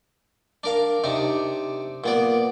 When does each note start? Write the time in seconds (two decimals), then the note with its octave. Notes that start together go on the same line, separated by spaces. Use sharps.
0.64 D4 A#4 F5
1.04 C3 D4 D#4
2.04 A#2 B3 D5